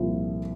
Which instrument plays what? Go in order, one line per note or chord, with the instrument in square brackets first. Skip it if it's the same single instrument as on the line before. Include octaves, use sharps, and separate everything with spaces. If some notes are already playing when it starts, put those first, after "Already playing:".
Already playing: [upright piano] C2 A#2 F3